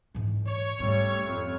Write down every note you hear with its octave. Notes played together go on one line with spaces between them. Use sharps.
G#2 E3
C#5
G#2 G3 A3 C#4
F2